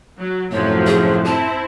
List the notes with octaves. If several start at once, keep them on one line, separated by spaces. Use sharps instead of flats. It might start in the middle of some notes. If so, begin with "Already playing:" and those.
F#3
F#2 A2 C3 F3 F#3 A3 C#5
G#4
C4 E4 A5